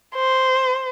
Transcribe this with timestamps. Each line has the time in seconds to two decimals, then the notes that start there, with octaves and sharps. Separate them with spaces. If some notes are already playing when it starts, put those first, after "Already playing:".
0.15 C5